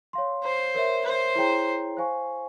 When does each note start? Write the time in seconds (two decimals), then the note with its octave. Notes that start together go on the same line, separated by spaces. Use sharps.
0.13 C#5 F5 C6
0.44 C5
0.75 A#4 C#5 E5
1.06 C5
1.35 E4 G#4 C#5 G5 A#5
1.97 C5 F5 G#5 C#6